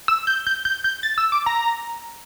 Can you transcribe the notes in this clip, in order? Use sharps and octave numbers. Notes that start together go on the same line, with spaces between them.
E6
G6
G6
G6
G6
A6
E6
D6
A#5